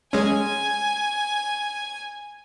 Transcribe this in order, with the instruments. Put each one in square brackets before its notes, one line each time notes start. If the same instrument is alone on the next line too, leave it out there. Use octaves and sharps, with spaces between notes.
[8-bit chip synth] G#3 C#4 [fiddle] G#5